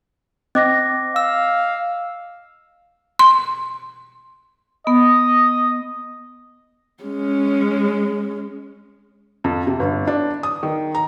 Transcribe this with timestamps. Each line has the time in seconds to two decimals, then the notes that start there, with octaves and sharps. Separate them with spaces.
0.55 C4 D#5 D6 A#6
1.16 F5 E6
3.19 C6
4.87 B3 D#5
7.03 G#3 C#4
9.44 F2
9.67 C3
9.80 G1
10.07 D4
10.43 D#6
10.63 D#3
10.95 A#5